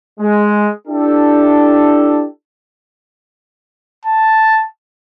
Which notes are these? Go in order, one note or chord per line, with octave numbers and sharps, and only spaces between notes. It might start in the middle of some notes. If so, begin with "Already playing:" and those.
G#3
D4 E4 G4 A4
A5